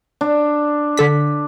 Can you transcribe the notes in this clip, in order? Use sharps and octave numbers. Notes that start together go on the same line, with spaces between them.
D4
D3 A4 B6